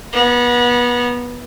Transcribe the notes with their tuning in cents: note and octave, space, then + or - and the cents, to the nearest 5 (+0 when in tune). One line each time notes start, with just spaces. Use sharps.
B3 -25 A#5 +0